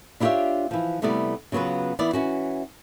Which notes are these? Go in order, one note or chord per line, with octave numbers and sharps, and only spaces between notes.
D4 E4 F4 G4 C#5 E5
E3 F3
C3 G3 A3 B3 E4 D5
C#3 F#3 B3 F4 B4
E3 B3 E4 D5
E3 C#4 F#4